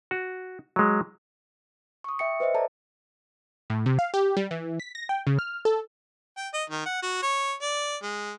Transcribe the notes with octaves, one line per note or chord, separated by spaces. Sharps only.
F#4
F#3 G#3
C#6 D#6
E5 G5 C#7
B4 C5 D#5 E5
A4 D5 A5 A#5
A2
C3
F5
G4
G3
E3
B6
A#6
G5
C#3
F6
A4
G5
D#5
D#3
F#5
F#4
C#5
D5
G#3